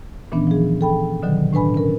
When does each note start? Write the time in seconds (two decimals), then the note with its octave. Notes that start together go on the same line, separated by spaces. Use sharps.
0.32 A#2 D#3 E3 B3 C#4 D4
0.47 F3 G#4
0.81 A4 G5 B5
1.23 B2 D3 D#3 F#3
1.53 A2 D4 B4 G#5 B5
1.74 C#4 A#4